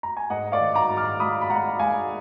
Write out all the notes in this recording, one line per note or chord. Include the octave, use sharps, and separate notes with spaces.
A#5
G#5
G#2 D#5 F#5
D5 F5
D#3
A#5 D6
G#2
D6 F6
G#3 B5 D#6
B5
G#3 F#5 A#5
G#3 F5 G#5